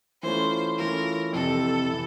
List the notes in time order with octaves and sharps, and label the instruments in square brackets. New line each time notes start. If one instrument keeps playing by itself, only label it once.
[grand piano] E3 A3 C#4 F4 [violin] C5
[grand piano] E3 A3 C#4 F4 [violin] A#4
[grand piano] F2 C3 E3 [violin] A4
[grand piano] C3 E3